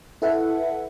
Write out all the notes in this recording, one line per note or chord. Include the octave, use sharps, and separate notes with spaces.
E4 A4 B4 E5 F#5